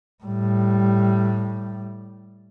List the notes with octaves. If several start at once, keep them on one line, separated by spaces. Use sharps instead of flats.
A2 G3